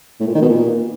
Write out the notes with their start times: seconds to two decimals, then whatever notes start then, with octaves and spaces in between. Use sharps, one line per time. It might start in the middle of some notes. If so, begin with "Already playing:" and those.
0.20 A2
0.27 A#2
0.35 D#3
0.42 B2
0.49 A#2